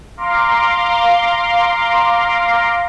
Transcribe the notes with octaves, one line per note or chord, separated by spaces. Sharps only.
F5 A#5 C6 D6